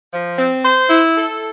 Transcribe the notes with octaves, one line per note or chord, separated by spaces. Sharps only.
F3
C4
C5
E4
A4